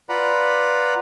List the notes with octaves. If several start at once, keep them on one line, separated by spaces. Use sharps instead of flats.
F4 B4 D5 F#5 A#5 B5